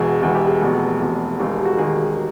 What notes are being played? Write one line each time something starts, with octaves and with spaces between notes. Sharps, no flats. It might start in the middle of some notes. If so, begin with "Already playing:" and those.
Already playing: E1 E2 B2 G#4
E1 E2 B2 G#4
G4
G#4
F1 E2 B2
F1 E2 B2
E1 D#2 D#3 G4
G#4
F#4
E1 D#2 D#3 G#4